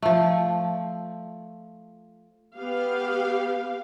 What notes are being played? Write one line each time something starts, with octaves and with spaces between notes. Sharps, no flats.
F3 A3
B3 G4 F5